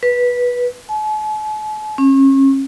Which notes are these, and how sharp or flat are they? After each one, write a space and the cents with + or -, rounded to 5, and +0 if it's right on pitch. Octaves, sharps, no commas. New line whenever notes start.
B4 -15
A5 -45
C#4 -35